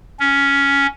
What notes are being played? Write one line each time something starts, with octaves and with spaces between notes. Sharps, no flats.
C#4